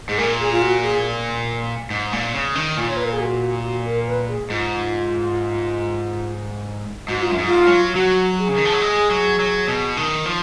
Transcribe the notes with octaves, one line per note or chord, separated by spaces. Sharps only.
G#2 G#4
A#2 A#4
G#4
F4
F#4
G#4
G#2
A#2
C#3
D#3
A#2 F4
C#5
B4
A#4
G#4
F#4
F#4
A#4
B4
G#4
G#2 F4
G#2 F#4
F4
F#2
G#2
F4
F#3
F#3 F#4
G#4
C#3
D#3
F3
F#3
G#3
F#3
F#3
B2
D#3
F3